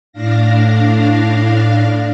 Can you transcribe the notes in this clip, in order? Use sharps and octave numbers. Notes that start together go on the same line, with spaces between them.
A2 D4 F5 A#6